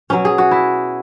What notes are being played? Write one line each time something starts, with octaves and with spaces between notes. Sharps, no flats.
B2 F#3 C#4
G#4
F#4
E4